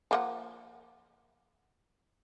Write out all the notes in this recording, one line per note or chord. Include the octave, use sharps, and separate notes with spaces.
F3 A#3 F#5